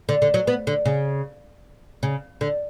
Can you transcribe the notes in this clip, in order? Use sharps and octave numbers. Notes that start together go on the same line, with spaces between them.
D3
D3
F#3
B3
D3
C#3
C#3
D3